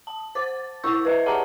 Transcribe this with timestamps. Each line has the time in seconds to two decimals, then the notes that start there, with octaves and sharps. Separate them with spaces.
0.07 A5
0.35 C5 D6 A6
0.83 E4 C5 C#6 E6 G6
1.05 B4 D#5 E5
1.26 G4 G#4 F#5 A5 A#5 D6